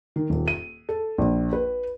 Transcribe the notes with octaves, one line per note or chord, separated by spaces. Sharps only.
D#3
D#1
D#7
A4
A#1
B4